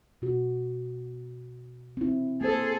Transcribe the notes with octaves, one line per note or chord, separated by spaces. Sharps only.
B2 F#4
C4 E4
A#3 G#4 A4 C5